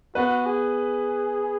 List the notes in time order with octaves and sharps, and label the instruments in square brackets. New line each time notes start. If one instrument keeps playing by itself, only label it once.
[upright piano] B3 B4 [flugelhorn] F#4
[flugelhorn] G#4